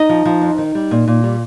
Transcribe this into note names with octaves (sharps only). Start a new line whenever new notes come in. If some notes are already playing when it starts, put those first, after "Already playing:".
Already playing: D#4 D#5
F3
F3
F2
D#3
G3
A#2
A#2
G3